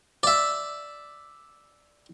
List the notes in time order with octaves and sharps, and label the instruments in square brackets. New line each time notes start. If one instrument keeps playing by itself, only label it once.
[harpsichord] D5 E5